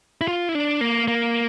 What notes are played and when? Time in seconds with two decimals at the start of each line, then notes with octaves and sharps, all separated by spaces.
0.21 E4
0.28 F4
0.49 E4
0.55 D4
0.81 A#3
1.08 A#3